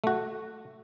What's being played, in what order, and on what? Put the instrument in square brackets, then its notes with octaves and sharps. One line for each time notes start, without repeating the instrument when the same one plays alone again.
[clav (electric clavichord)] A3 F#4